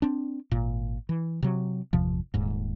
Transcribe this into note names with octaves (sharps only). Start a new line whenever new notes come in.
C4 D4
G#1 A#2
E3
C3 F#3
G1 E2 C3 F3
D#1 D#2 G#2